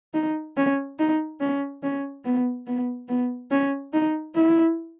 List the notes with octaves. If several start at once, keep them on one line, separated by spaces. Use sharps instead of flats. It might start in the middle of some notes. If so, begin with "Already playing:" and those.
D#4
C#4
D#4
C#4
C#4
B3
B3
B3
C#4
D#4
E4